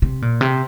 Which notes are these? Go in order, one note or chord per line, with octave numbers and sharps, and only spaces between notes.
C3
A#2
C3